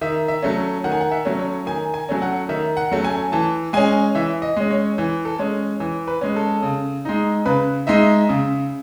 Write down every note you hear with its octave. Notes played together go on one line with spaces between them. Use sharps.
D#3 E5
E5
F#3 A3 C#4
D#3 F#5
G#5
F#5
E5
F#3 A3 C#4
C#5
D#3 G#5
G#5
F#3 A3 C#4
F#5
D#3 E5
F#5
F#3 A3 C#4
G#5
E3 A5
G#3 C#4 G#5
E3 E5
D#5
G#3 C#4
C#5
E3
A4
G#3 C#4
E3
B4
G#3 C#4
A4
C#3
G#3 D#4
C#3 B4
G#3 D#4 E5
C#3